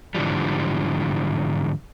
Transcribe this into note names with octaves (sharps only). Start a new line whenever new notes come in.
G#2 D3 E3 F3 G3